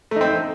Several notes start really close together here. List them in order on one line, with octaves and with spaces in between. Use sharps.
A3 D#4 C4